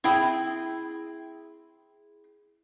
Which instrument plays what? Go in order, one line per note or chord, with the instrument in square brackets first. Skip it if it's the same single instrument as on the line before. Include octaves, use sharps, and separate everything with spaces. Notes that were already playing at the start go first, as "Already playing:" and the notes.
[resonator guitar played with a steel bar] C4 E4 G#4 G5